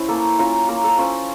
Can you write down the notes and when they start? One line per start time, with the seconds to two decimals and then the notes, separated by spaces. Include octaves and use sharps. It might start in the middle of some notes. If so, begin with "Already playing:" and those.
Already playing: C#4 E4 C5
0.08 A#3 A4
0.39 C#4 F4 A#4
0.68 A#3 A#4
0.84 A4
0.98 C#4 F4 C5